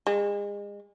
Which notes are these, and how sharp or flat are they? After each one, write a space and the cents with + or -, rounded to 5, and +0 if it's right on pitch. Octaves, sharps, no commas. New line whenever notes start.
G#3 -35